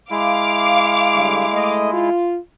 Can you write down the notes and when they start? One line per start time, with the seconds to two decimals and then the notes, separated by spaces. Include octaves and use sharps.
0.11 G#3 E4 F5 D6
1.14 D3 G3 A3
1.52 A3 D#5
1.92 F4